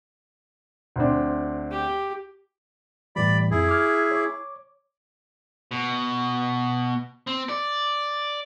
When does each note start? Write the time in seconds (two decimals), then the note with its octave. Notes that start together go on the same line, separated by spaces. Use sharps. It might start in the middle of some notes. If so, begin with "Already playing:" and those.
0.96 D2 C4 D4
1.71 G4
3.16 A2 E3 G3 D5 B5
3.51 F2 E4 G#4
3.68 D6 F6
4.11 C#5 D6
5.71 B2
7.27 C4
7.49 D5